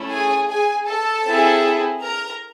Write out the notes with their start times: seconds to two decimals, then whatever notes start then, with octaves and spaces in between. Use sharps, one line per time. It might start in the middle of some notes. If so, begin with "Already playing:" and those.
Already playing: A3 C#4 E4
0.10 G#4 G#5
0.48 G#4 G#5
0.86 A4 A5
1.25 C4 E4 G#4
2.01 A#4 A#5